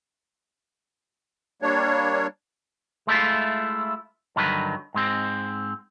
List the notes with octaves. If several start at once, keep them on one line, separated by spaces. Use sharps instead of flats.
G3 A#3 D4 C#5
G#3 A3 E4 F4
G2 D3 D#3 F#3 B4
G#2 G#3 C4